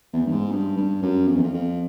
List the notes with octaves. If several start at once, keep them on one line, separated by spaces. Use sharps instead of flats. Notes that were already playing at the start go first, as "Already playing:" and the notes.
E2
G2
G#2
G2
G2
F#2
F2
E2
F2
F2